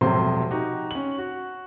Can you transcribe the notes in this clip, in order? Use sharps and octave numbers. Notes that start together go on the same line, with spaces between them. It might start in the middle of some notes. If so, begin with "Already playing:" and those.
E1 A2 C3 F3 F#3 C6
D#4 F#4 G4
C#4 F#7
F#4